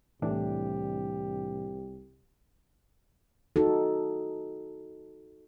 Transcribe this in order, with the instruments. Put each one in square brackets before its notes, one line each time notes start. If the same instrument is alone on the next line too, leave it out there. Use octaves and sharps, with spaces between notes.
[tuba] C2 [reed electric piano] A2 E3 D4 [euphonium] G4
[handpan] D#4 F#4 A4